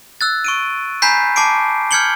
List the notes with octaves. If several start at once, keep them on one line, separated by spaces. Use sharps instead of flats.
E6 F#6 A6
C#6 D7 D#7
G#5 A#5 B5 G6 B6 C7
A5 D6 C7 D7
F6 G6 G#6 C#7 F#7 G7